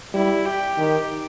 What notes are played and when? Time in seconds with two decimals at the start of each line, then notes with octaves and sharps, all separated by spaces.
0.14 G3 E4
0.46 G4
0.78 D#3